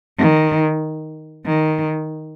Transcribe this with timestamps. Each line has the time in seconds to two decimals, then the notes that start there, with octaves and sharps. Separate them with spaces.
0.19 D#3
1.46 D#3